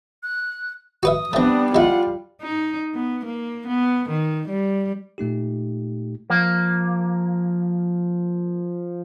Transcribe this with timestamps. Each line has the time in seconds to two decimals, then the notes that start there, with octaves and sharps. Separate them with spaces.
0.23 F#6
1.03 F#4 B4 E5 D#6
1.33 G3 A3 B3 C4 D4
1.75 G#3 E4 F4 F#5
2.42 D#4
2.94 B3
3.25 A#3
3.67 B3
4.09 D#3
4.48 G3
5.18 A#2 A3 D#4 G4
6.30 F3 A#3